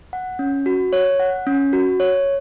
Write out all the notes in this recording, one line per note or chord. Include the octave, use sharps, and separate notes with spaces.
F#5
C#4
F#4
C#5
F#5
C#4
F#4
C#5